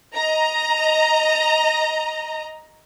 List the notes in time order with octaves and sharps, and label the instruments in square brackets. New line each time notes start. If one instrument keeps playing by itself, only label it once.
[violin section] D#5 A#5